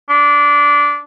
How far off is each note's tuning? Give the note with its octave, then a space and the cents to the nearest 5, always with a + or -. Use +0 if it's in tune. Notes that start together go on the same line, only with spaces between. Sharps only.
D4 -15